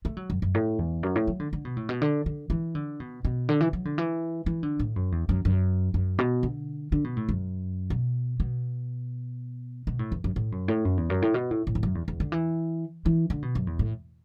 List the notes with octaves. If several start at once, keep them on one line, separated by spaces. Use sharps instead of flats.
A3
F#3
F#2
F#2
A2
E2
F#2
A2
F#3
D3
D3
B2
A2
B2
D3
D3
E3
D3
B2
B2
D3
E3
F#3
D3
E3
E3
D3
A2
F#2
E2
F#2
F#2
F#2
B2
D3
D3
B2
A2
F#2
B2
B2
B2
A2
E2
F#2
A2
F#2
A2
F#2
E2
F#2
A2
B2
A2
A2
E2
F#2
E2
E2
D3
E3
E3
D3
B2
F#2
E2
A2